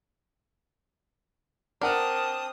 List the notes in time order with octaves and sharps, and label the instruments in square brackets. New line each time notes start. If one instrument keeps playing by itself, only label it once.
[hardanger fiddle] C4 D#6 [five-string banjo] D4 [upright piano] A#4 F#5 F6 [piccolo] A5